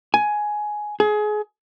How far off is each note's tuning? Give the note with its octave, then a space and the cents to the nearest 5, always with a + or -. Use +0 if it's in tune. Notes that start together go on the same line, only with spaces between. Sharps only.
G#5 +10
G#4 +25